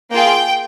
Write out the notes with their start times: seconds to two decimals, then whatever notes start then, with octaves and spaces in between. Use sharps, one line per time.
0.11 A#3 F4 G#4 G5